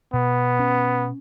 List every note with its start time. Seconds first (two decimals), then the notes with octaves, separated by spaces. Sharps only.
0.14 B2 B3
0.59 C#4